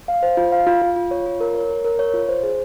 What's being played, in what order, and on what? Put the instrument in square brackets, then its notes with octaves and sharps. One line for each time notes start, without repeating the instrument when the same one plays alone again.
[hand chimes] F5
C5
F4
F5
F4
F4
F4
C#5
F4
A#4
C#5
A#4
A#4
C#5
F4
C5
G#4